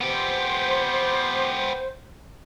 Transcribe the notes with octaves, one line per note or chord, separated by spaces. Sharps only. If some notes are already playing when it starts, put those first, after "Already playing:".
B3 G4 C5